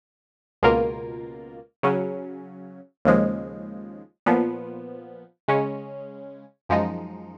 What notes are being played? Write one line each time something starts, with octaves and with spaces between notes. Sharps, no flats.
C#2 B2 A#3 F4 A#4
C#3 F#3 C#4
D#2 C#3 F3 G#3
A#2 F3 B3
C#3 G#3 C#4
F#2 F3 G#3 D#4